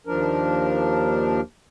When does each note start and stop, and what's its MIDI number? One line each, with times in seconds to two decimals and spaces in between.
0.07 1.41 39
0.07 1.41 53
0.07 1.41 62
0.07 1.41 70